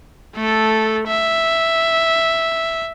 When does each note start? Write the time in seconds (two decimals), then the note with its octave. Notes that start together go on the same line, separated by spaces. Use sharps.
0.35 A3 A4
1.08 E5